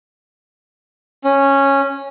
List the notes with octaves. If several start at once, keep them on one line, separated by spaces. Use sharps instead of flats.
C#4